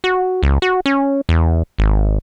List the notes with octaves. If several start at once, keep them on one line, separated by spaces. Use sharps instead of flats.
F#4
C#2
F#4
C#4
E2
G#1